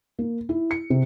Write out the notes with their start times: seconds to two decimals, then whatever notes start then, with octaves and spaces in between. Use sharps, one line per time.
0.19 A#3
0.49 E4
0.71 C#7
0.90 C3